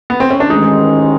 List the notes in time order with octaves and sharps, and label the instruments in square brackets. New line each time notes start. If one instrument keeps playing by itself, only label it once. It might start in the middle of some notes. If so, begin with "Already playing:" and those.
[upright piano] B3
C4
C#4
D4
[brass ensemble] A1 G#2 D#3 G#3 [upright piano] D#4